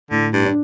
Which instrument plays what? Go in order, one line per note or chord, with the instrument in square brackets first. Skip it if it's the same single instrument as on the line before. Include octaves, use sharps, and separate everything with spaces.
[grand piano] A2 [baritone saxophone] D3
[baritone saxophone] G2
[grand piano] D4